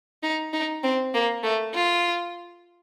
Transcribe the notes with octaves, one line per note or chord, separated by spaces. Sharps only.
D#4
D#4
C4
A#3
A3
F4